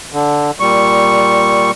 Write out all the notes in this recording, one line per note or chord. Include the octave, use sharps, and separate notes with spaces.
D3
A#2 G3 C#6